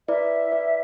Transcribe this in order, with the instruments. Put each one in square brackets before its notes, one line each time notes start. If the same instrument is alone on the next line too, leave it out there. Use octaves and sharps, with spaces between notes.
[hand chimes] E4 B4 D5 [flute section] E5
[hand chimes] E4 B4 D5